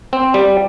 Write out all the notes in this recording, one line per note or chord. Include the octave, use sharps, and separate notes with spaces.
C4
G3